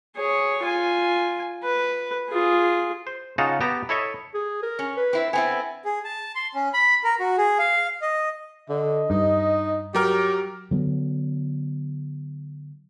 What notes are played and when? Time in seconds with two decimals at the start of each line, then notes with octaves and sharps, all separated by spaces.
0.16 G#4 C#5
0.63 F4 G#5
1.64 B4
2.30 F4 G#4
3.07 C5
3.38 C#3 D#4 F4 F#5 A5 A#5
3.61 B3 G4 A5 A#5
3.89 E4 A4 C#5 D#5 E5
4.34 G#4
4.63 A#4
4.79 C#4
4.97 B4
5.13 C4 E4
5.33 B3 C4 E4 G#5
5.85 G#4
6.05 A5
6.35 C6
6.54 C#4
6.74 B5
7.04 A#4
7.20 F#4
7.38 G#4
7.59 F5
8.02 D#5
8.69 D3 D#5
9.10 G2 D#4
9.95 F#3 G4 A#4 F6
10.71 D3 F#3 B3